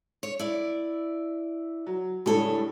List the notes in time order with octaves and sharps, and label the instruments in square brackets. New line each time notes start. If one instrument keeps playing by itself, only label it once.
[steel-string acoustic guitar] C#5
E4 D5
[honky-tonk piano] F#3
[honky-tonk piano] A2 G3 D4 [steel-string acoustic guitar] G#3 A4 C#5